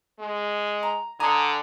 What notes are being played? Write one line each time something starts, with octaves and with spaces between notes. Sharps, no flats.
G#3
A#5
D3 G#5 A#5 D#6